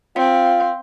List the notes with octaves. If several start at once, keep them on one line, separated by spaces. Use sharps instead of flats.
C4 F4 F5